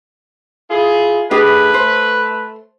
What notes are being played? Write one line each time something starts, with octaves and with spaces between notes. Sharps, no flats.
E4 F4 G#4
A3 D4 G4 G#4 B4
C5